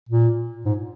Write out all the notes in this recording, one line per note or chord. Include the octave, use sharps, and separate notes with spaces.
A#2
G#2